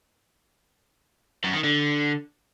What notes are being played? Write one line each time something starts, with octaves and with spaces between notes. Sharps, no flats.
F#2
D#3
D3